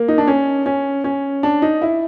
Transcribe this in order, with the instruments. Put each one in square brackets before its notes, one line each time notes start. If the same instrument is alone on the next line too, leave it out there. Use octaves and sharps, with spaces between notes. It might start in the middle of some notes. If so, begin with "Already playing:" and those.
Already playing: [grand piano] A#3
D#4
D4
C#4
C#4
C#4
D4
D#4
E4